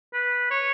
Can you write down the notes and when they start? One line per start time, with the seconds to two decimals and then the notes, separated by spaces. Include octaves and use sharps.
0.14 B4
0.51 C#5